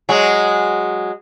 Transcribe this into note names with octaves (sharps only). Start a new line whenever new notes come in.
F#3 G#3